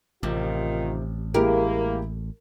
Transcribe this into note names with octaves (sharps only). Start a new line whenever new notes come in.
A1 C3 D#3 F4
G#3 A#3 E4 G4 A#4